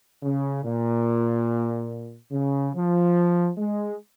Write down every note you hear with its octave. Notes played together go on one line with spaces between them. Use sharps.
C#3
A#2
C#3
F3
G#3